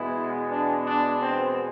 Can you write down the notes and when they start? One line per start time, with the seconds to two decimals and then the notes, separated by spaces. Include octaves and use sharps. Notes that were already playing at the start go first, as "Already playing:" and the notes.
Already playing: E2 B2 G#3 B3 E4
0.51 D4
0.86 D4
1.23 C4